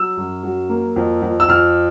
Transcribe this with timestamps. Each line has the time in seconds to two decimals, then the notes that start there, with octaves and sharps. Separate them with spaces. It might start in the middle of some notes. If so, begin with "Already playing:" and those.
Already playing: F#3 E6
0.17 F#2
0.43 F#3
0.69 A#3
0.96 F2
1.22 F2
1.40 E6
1.48 F2 F6